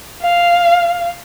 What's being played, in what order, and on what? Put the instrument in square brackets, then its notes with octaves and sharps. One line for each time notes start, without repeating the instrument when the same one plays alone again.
[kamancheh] F5